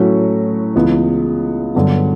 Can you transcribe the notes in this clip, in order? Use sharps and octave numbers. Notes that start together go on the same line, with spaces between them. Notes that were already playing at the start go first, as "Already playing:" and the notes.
Already playing: A2 F#3 A3 C#4 F#4
C#2 C#3 E3 B3
G2 D3 F#3 B3